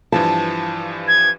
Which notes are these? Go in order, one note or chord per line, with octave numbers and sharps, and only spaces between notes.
G2 E3 F3 A5
G#6